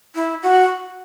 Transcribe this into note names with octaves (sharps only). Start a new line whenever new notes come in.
E4
F#4